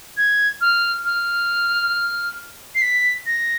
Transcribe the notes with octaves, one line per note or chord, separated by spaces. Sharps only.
G#6
F6
F6
C7
B6
A#6